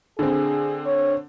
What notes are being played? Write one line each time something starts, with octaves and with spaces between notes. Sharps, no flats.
D3 C4 G#4
C#5